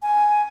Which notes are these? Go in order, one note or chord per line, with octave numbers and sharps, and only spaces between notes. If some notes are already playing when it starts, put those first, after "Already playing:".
G#5